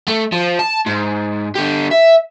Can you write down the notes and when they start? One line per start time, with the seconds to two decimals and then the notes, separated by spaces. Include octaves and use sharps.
0.08 A3
0.32 F3
0.59 A5
0.86 G#2
1.55 D3 G4
1.91 E5